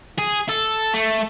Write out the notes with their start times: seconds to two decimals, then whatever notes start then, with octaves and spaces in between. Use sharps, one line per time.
0.19 G#4
0.49 A4
0.94 A3